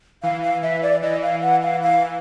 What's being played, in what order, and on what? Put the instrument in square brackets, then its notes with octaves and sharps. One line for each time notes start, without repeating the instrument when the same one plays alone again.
[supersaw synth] E3 [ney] F5
[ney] F5
[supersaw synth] E3 [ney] E5
[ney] D5
[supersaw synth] E3 [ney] D#5
[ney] F5
F#5
F5
F5